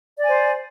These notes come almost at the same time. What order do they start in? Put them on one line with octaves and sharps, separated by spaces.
D5 G#5 C5